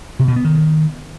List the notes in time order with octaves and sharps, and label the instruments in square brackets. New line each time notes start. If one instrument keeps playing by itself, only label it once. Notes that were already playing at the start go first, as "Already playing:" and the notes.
[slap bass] C3
B2
B3
D#3